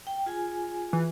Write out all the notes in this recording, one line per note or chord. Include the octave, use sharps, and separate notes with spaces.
G5
F4 G#4 G#5
E3